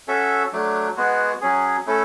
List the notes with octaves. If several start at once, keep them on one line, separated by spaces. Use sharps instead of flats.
C#4 F#4 A4 E5
F#3 A3 D4
G#3 B3 F#4
F#3 C#4 G#4
A3 C#4 E4 A4